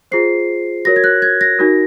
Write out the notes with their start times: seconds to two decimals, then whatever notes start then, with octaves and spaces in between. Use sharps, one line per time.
0.11 F4 G#4 C5 C7
0.85 F#4 A#4 C#5 A#6
0.96 G#6
1.04 F#6
1.22 G#6
1.41 A#6
1.59 D#4 F#4 A#4